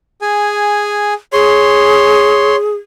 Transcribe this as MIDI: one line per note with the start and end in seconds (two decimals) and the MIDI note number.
0.22 1.14 68
0.22 1.14 80
1.33 2.75 68
1.33 2.56 73
1.33 2.56 84